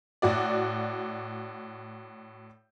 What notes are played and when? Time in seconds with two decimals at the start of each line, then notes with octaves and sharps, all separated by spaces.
0.22 A2 F#4 D5